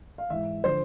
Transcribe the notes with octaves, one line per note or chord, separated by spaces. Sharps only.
F5
G#2 E3 E5
D3 F3 C5